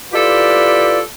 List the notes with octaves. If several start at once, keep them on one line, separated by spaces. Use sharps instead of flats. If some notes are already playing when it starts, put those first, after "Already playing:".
E4 F4 G4 A4 B4 D5